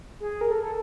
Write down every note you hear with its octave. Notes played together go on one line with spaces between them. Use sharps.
G#4
A#4
A4
A4